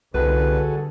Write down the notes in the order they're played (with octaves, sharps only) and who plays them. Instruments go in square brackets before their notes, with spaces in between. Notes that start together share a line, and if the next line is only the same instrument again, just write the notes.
[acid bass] C2 [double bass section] D3 G3 [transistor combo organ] F#4 G#4 A4 [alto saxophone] B4